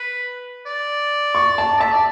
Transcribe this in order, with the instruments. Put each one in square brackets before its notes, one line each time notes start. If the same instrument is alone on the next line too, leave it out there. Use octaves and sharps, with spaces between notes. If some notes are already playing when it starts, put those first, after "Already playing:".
Already playing: [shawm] B4
D5
[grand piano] C#6
A5
[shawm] E5 [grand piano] A5
[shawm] D5